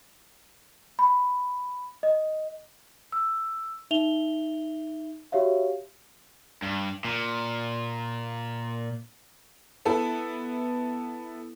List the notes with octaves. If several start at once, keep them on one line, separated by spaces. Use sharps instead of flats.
B5
D#5
E6
D#4 E5 F7 G7
F#4 G4 C#5 E5 F5
G2
A#2
B3 E4 A4